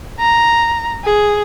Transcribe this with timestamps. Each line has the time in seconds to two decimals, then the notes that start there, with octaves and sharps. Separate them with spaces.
0.19 A#5
1.04 G#4